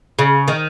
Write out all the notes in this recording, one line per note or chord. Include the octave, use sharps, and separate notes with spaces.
C#3
D#3